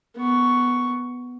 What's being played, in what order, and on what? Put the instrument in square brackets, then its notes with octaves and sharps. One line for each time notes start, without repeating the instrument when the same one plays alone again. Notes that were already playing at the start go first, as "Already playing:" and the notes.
[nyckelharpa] B3 C#6